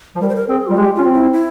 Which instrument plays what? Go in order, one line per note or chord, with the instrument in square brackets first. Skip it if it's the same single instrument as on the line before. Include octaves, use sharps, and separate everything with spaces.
[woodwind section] F3
[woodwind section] G3 [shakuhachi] A#4
[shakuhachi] C5
A#4
[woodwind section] C4 [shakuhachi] G#4
[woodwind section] G3 [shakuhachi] F4
[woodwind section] G#3 [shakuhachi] G4
[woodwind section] C#4 [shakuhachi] F4
[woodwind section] C4
[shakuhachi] E4
E4